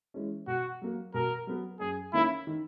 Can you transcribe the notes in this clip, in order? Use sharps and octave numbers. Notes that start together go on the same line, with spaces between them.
E3 G#3 C#4
B2 F#4
F#3 A#3
B2 A#4
F#3 B3
F#2 G#4
D#3 A#3 C#4 E4
D#3